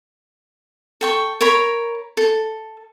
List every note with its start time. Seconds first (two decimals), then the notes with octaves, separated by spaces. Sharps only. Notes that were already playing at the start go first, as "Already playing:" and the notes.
1.01 A4 G5 C#6
1.41 A#4 C#5 A#5 B5
2.17 A4